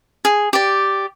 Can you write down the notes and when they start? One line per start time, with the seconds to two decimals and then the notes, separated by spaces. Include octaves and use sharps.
0.25 G#4
0.53 G4 D5